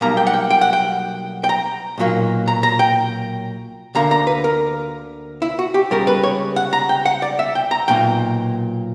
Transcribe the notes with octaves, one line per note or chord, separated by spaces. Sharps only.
B1 B2 G3 A#3 A#5
G5
F#5
G5
G5
F#5
G5
G5
A#5
B1 A#2 F#3 A#3
A#5
A#5
G5
D2 D3 A#3 A#5
A#5
B4
A#4
E4
F#4
G4
C#2 C#3 G3 A#4
B4
C#5
F#5
A#5
G5
F#5
D5
E5
G5
A#5
B1 A#2 A#3 G5